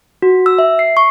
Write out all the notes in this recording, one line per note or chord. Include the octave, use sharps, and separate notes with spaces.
F#4
E6
E5
C7
C#6